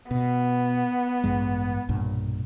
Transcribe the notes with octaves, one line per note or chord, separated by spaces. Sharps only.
B2 B3
A1 G2 G#3
B1 G2 A#2